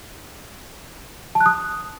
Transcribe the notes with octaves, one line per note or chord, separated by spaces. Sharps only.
A5
F#6
D#6